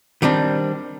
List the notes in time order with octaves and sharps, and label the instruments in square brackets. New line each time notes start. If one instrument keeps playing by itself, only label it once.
[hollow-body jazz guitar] D#3 G3 C4 D4